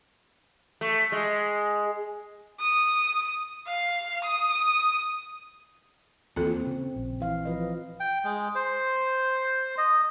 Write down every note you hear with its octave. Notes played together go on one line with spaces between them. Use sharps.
A3
G#3
D#6
F5
D#6
D#2 E3 A#3 C4 F4 A4
C#3
A#1
E3 F5
F3 B4 D#5
G5
G#3
C5
D#5